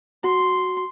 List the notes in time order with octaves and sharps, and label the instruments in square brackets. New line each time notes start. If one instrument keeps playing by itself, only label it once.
[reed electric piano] F#4 [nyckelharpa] C6